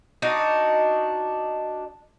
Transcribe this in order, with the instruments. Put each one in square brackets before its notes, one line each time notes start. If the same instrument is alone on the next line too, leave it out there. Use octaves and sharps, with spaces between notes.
[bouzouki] D4 D#4 F#4